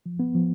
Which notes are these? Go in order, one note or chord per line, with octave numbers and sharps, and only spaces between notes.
F3
B3
F3